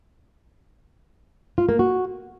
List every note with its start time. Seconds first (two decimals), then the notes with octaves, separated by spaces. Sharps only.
1.58 F4
1.69 A#3
1.79 F#4